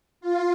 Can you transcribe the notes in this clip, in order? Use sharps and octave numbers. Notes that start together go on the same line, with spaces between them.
F4